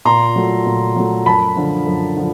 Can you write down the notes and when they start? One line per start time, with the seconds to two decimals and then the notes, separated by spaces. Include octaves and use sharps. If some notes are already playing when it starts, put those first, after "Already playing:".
0.05 A#2 A#5 C6
0.36 F#3 A3
0.66 A#2
0.96 F#3 A3
1.26 F#2 A5 B5
1.56 D3 F3
1.87 F#2
2.17 D3 F3